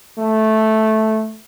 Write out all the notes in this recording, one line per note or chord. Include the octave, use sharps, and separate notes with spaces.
A3